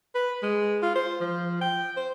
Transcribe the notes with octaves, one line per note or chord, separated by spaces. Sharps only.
B4
G#3
F4
C5
F3
G5
C5